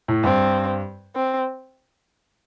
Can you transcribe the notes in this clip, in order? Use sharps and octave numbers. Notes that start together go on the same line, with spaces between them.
A2
G2 C4
C4